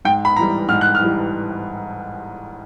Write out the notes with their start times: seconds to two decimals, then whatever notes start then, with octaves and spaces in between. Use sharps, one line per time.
0.05 G#2 G5
0.25 B5
0.36 E3 G3 A#5
0.68 G#2 F6
0.81 F#6
0.95 F6
1.01 E3 G3